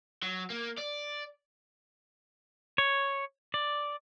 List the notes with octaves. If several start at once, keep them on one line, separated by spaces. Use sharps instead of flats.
F#3
A#3
D5
C#5
D5